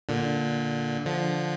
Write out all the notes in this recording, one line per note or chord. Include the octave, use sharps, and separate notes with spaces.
A#2 D3
D3 F3